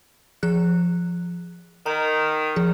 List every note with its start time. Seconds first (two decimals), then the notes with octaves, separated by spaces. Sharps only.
0.43 F3 G#4 F#6
1.86 D#3 A#5
2.56 F3 G#4